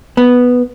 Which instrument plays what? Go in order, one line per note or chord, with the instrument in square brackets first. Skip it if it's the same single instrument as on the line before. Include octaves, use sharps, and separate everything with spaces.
[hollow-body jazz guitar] B3